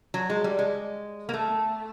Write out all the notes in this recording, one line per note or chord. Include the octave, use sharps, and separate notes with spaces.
F#3
G#3
G3
G#3
A#3
A3